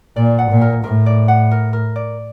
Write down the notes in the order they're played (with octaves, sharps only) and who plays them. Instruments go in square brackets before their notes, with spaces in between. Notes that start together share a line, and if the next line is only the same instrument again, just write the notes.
[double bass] A#2 [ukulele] D5
[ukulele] F#5
[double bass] A#2
[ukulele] A#4
[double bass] A2 [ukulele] A#4
[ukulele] D5
F#5
A#4
A#4
D5